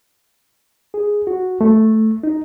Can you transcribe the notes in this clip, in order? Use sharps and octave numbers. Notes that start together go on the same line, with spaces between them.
G#4
F#4
A3
D#4